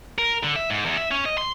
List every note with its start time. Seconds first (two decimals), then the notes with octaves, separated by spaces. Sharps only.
0.18 A#4
0.43 D3
0.56 E5
0.70 G#2
0.86 E2
0.97 E5
1.11 C#4
1.26 D#5
1.38 C6